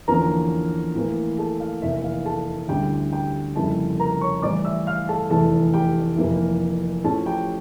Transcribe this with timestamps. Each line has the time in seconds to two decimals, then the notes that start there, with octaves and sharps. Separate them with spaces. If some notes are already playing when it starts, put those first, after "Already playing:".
0.08 E2 D3 F3 A#3 C#4 A#4 A#5
0.95 A2 E3 A#3
1.38 A4 A5
1.60 F5
1.82 F1 E2 E3 A#3 E5
2.04 F5
2.25 A4 A5
2.69 D2 D3 G3 C#4 E4 G4 G5
3.12 G4 G5
3.55 F2 C#3 G3 A#3 E4 A4 A5
3.99 A#4 A#5
4.21 C#5 C#6
4.42 A2 E3 G3 D5 D6
4.65 E5 E6
4.87 F5 F6
5.09 A4 A5
5.30 F1 E2 E3 A3 E4 A4 A5
5.73 G4 G5
6.17 F1 F2 E3 A#3 E4
7.04 A2 F3 C#4 A4 A5
7.26 G4 G5